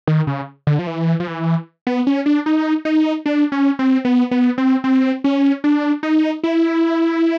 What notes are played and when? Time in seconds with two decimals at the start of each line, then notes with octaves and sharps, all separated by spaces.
0.07 D#3
0.27 C#3
0.67 D3
0.79 F3
0.87 E3
1.20 F3
1.27 E3
1.87 B3
2.07 C#4
2.26 D4
2.46 D#4
2.85 D#4
3.26 D4
3.52 C#4
3.79 C4
4.05 B3
4.31 B3
4.58 C4
4.84 C4
5.24 C#4
5.64 D4
6.03 D#4
6.43 E4